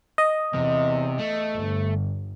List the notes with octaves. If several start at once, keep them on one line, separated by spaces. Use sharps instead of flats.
D#5
E2 C3
A3
G1